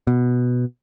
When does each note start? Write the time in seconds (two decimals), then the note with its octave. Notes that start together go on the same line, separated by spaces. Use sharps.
0.07 B2